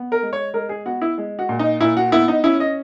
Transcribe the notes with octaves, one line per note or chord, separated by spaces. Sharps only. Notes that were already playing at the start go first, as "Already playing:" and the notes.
Already playing: B3
A#4
G#3
C#5
G#3 A#4
G#4
B3 F#4
E4
G#3
F#4
A#2
D#4
A#2 E4
F#4
B3 E4
D#4
C#4 E4
D#5